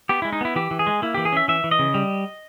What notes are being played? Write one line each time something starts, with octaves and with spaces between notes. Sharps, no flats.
B3 G4
G#3 E4
D#4
B3 E4
E3 G4
E3
G#4
G#3
A#3 E4
E3 G4
G#4
C#4 E5
E3 E5
E3
D#5
C#3
G3